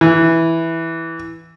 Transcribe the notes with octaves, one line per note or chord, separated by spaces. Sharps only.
E3